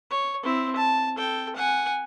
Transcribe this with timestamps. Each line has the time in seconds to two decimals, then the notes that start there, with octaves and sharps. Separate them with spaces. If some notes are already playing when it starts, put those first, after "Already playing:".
0.11 C#5
0.43 C4 E4
0.76 A5
1.16 A4 G5
1.56 F#5 G#5